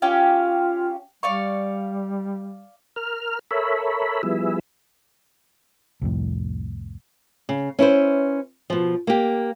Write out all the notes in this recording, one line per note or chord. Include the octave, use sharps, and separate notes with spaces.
C#4 F4 G4 F5
G3 D5 F5 C#6
A#4 F6
A4 A#4 C#5 E5 B5
F3 G3 B3 E4 G#4 E5
C2 F2 A2
C#3
C#4 E4 B4 C5
B2 F3
A#3 G4